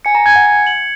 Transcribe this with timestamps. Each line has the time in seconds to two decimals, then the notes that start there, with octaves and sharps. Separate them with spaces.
0.05 G#5 C#7
0.15 A#5
0.26 G#5 G#6
0.36 F#5
0.46 G#6
0.67 F#7